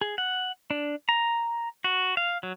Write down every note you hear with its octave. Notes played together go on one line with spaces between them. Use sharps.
G#4
F#5
D4
A#5
F#4
F5
F#3